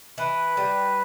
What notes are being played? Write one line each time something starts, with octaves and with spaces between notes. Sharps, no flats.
E3 B4
G3